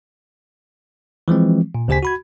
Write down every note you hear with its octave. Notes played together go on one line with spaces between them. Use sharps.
E3 F3 G#3 C4
A#2
D2 C#3 G4 C5 G#5 B6
F#4 B5 G#6